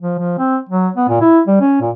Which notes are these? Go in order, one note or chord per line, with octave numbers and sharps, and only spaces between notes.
F3
F3
C4
F#3
B3
A#2
E4
G3
C#4
A#2